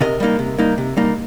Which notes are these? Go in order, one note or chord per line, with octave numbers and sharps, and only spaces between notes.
C3 A#4 D#5
G3 A#3 D#4
C3
G3 A#3 D#4
C3
G3 A#3 D#4